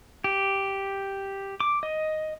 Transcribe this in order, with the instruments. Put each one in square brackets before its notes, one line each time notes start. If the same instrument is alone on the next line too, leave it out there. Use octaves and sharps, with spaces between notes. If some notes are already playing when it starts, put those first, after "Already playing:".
[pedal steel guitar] G4
D6
D#5